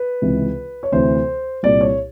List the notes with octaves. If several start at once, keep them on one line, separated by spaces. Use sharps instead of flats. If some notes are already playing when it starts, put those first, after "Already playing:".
Already playing: B4
C#2 C3 E3
C#5
D2 C3 E3 C5
C2 A#2 D5
C#5